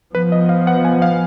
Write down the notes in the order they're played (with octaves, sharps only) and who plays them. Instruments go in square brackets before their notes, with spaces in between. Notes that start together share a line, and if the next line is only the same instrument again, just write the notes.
[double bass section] F3 B3 [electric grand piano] B4
[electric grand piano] D#5
F5
F#5
G#5
F5